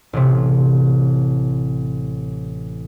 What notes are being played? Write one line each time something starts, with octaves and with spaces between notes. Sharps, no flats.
A1 C3